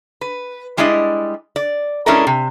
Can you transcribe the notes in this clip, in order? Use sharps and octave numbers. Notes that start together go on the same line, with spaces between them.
B4
G3 G#3 D4 E4 D#5
D5
G#3 C#4 D4 E4 A4 A#4
C3